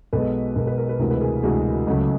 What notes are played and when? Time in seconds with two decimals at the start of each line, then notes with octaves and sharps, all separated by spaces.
0.13 B1 B2 G#3 A4 B4
0.56 B1 B2 G#3 A#4
0.67 B4
0.78 A#4
0.89 B4
1.00 D2 C3 E3 G#3 A#4
1.10 B4
1.21 G#4 A#4
1.43 D2 C3 E3 G#3 F#4 G#4
1.87 C#2 C#3 F#3 A3